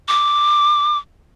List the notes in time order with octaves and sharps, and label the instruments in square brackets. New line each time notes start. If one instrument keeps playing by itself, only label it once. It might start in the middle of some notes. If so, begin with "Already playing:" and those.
[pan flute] D6